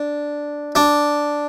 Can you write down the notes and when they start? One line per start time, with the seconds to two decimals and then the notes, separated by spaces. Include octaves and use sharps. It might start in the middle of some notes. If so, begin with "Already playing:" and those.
Already playing: D4
0.75 D4